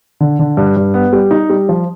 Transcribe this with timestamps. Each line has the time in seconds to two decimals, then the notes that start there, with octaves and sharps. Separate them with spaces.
0.20 D3
0.39 D3
0.57 G2
0.76 G2
0.94 B3
1.13 G3
1.31 D#4
1.50 G3
1.69 F3